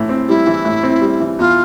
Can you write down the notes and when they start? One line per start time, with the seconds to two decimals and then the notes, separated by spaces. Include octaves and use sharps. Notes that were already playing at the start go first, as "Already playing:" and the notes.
Already playing: A2 E3
0.09 C4
0.28 G3 E4
0.47 E3
0.65 A2
0.83 C4
1.01 G3
1.20 E3
1.39 E2 F4